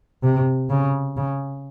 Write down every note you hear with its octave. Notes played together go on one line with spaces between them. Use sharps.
C3
C#3
C#3